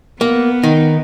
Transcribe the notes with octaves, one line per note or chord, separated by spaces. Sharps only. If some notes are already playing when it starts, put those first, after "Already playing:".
A#3 B3
D#3 D#4